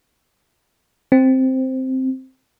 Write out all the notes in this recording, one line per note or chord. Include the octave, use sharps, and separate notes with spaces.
C4